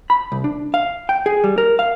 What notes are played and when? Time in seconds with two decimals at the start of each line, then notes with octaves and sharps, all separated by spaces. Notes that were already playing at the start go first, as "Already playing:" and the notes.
0.10 B5
0.32 C2
0.44 D4
0.74 F5
1.09 G5
1.26 G#4
1.44 G3
1.58 A#4
1.79 F5